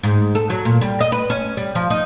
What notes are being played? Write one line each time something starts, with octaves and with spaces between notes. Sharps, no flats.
G#2
A4
F#3
A#2
G3
D#5
B4
C#4
G3
F3
D#4